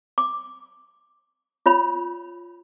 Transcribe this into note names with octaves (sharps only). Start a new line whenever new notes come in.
D6
F4 C#5 B5